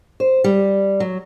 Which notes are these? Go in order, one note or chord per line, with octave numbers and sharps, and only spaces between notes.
C5
G3
F#3